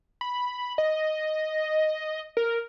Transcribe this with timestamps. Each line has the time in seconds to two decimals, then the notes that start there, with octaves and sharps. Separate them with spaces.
0.21 B5
0.78 D#5
2.37 A#4